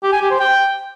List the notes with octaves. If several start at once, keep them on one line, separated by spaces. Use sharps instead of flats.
G4
G#5
G4
C5
G5